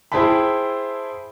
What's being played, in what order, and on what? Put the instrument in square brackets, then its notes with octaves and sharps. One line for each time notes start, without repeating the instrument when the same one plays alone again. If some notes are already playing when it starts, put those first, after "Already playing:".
[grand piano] E4 G#4 C5 G5 A5 B5